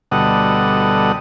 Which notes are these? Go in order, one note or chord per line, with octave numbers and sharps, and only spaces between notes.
D2 B2 G3 A4 D#5 F#5